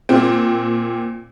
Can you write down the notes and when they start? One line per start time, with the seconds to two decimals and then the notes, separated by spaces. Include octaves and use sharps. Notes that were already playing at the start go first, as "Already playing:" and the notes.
0.09 A#2 C4